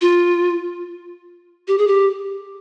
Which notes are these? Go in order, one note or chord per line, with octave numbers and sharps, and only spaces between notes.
F4
G4
G#4
G4